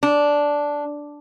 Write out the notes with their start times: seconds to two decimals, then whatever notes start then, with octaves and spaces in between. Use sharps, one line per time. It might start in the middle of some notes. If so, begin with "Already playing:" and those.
0.03 D4